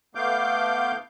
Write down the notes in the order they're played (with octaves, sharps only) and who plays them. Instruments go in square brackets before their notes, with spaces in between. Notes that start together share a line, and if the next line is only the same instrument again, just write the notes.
[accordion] A3 B3 F5 D6 G6